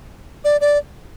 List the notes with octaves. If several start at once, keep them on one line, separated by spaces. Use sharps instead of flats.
D5
D5